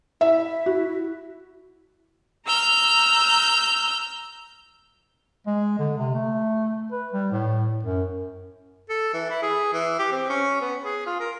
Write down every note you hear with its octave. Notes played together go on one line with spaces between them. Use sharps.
E4 E5
F#4
A#5 E6 F6 G6
G#3
D3
C3
A3
B4
G3
A2
F#2
A4
E3
E4
G#4
E3
G4
C4
C#4
B3
G#4
F4
A#4